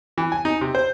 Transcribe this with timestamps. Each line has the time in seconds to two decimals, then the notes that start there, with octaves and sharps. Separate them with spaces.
0.18 E3
0.32 G#5
0.45 D#4
0.61 C3
0.75 C5